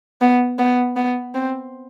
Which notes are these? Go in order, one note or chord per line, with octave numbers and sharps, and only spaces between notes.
B3
B3
B3
C4